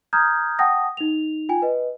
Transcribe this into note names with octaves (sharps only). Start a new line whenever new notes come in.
A#5 D#6 F6 G6 G#6
F#5 G5 A5 D#6 A#6
D#4 F7
F4 G5 G#5
B4 D#5